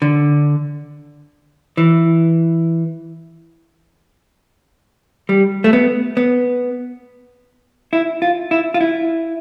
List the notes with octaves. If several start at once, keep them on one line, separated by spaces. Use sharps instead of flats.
D3
E3
G3
A3
B3
B3
E4
F4
E4
F4
E4